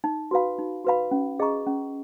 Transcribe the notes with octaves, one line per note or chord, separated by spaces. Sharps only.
D#4
F#4 B4 F5 B5
D#4
F#4 B4 F5 B5
C#4
G#4 D#5 A#5 C#6
C#4